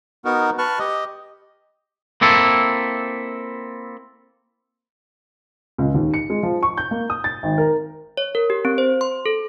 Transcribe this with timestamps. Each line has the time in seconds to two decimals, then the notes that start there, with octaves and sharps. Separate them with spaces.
0.25 B3 D#4 F#4 A#4
0.58 B4 A5 C#6 F6 F#6
0.79 G4 D#5
2.21 A#3 C4 E4 A4
5.78 C#2
5.94 D#2
6.14 C#7
6.30 G#3
6.43 F3
6.63 C#6
6.77 G6
6.91 A#3
7.10 D#6
7.24 A6
7.43 G#1
7.58 A#4
8.17 C#5
8.35 A#4
8.50 G4
8.65 C4
8.78 C5
9.01 C6
9.26 A4